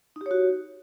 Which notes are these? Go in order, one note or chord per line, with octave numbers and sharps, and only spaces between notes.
D#4 F#4 G4 C#5